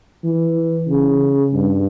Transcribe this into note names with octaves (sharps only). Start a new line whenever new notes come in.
E3
C#3
G2